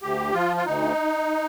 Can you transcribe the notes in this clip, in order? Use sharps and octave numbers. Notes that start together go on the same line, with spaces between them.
D2 G4
F3 F4
F4
D2 D#4